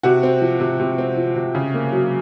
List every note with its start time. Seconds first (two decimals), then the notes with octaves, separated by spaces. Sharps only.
0.03 C3 F#4
0.23 C4
0.41 F3
0.60 C3
0.80 C3
0.98 C4
1.17 F3
1.36 C3
1.55 C#3
1.74 A#3
1.92 F#3